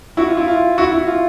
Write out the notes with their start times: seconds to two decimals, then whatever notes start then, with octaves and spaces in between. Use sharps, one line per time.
0.17 E4 F#4
0.28 F4
0.37 E4
0.48 F4
0.78 E4 F#4
0.92 E4
1.07 F4